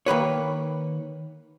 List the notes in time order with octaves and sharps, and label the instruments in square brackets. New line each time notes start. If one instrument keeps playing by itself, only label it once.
[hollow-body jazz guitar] D#3 A#3 B4 C#5